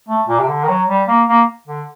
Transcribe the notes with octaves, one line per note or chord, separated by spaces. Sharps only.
A3
A#2
C3
D3
D#3
F#3
G3
A#3
A#3
D3